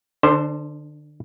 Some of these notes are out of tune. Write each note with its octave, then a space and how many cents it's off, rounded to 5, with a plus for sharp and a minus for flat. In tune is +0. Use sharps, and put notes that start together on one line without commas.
D3 +30 D4 -25 C5 +0